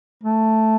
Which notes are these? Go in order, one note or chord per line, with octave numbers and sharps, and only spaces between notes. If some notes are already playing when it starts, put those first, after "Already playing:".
A3